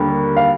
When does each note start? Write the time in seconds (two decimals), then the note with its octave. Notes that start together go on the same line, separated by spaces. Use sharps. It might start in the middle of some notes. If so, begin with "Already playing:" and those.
Already playing: D#2 D3 G3 A#3
0.37 F5